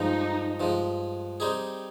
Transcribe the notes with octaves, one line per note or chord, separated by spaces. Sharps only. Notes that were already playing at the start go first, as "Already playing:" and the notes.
Already playing: G2 F3 G#3 D#4
G2 F3 G#3
G3 C4 D#4 G#4